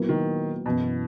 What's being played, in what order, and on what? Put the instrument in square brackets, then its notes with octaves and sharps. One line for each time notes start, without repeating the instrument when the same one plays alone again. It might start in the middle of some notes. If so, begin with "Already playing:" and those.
Already playing: [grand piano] A#2 F#3 B3 E4 A#4
[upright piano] D#3
[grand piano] F#2 E3 B3 E4 [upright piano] B2